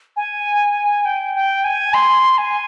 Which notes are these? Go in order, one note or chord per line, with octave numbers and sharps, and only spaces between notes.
G#5
G5
G5
G#5
C6
G#5